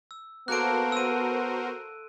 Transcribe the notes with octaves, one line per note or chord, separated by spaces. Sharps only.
E6
A#3 B3 F#4 A4 A#4 C5 F#6 D7
A5 C6 E6 D#7